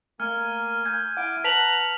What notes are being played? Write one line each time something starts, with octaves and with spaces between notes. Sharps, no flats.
A3 A#3 G#5 F6
G#5 G6 G#6
E4 F#5 G#5 D6
B4 F#5 A5 A#5 B6 F7 F#7